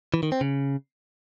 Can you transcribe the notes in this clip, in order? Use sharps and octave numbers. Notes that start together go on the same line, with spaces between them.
E3
D#3
C4
C#3